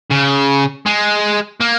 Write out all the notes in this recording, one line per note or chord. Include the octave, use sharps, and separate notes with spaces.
C#3
G#3
A#3